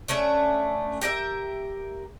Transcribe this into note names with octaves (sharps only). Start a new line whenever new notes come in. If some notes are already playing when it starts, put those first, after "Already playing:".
A3 C#4 D4 E5
G4 A#4 D#5 E5